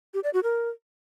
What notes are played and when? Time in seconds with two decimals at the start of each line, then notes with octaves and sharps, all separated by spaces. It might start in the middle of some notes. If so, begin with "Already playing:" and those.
0.14 G4
0.24 D5
0.33 F#4
0.43 A#4